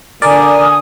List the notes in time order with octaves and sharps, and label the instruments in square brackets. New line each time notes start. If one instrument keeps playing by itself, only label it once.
[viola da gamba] D3 [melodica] A#4 [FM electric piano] D5 [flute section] G#5 D#6